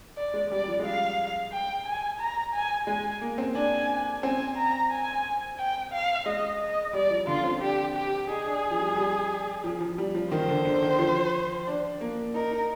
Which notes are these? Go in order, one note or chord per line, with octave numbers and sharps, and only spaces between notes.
D5
G#3
G3 D5
G3
F3
G#3
G3 F5
G5
G#5
A#5
G#5
G#3 G#5
A#3
C4
D4 G#5
C4 G#5
A#5
G#5
G5
F5
G#3 D#5
D#5
G3 D5
F3
D3 F4
C4
D4 G4
G4
D#4 G#4
D4
F3
G3
G3
F3
F3
G3
F3
D#3 C5
D3
D3
D#3
F3
D4
A#3
D#4 A#4
D#4